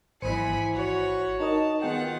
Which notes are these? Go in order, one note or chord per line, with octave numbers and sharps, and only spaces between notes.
G#1 E3 C5 G#5 B5 C#7
F#4 C#5 F#5
D#4 A#4 D#5 A5
D#3 B3 F4 G#4 F#5 G5